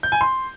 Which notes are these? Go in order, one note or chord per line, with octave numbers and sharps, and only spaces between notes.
G6
G#5
C6